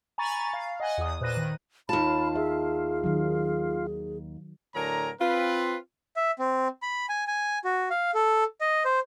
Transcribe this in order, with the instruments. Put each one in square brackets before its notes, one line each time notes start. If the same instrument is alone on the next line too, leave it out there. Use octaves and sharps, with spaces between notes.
[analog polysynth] G#5 A#5 B5 C#6 A6
F5
D#5 F#5 G#5
E2 D#6
A#2 B4 C5 F#6 A#6 D#7
D#3
[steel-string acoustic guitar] D#2 A5 [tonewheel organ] F4 [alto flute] B5
[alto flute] G#4 [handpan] E5
[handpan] D#3 F#3
[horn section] A2 D3 F#3 A#4 G#5 A#5
C4 F4 B4
[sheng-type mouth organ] E5
C4
B5
G#5
G#5
F#4
F5
A4
D#5
C5